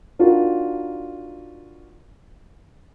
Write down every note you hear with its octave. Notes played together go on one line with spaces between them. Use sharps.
D4 D#4 F4 F#4 A#4